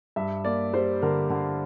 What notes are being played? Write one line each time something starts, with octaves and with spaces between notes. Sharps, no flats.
G2 E5
A#3 D5
G3 C5
D3 A#4
D3